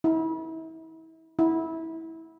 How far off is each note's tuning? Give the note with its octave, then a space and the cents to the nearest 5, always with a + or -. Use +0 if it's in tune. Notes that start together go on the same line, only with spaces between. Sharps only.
E4 -35
E4 -20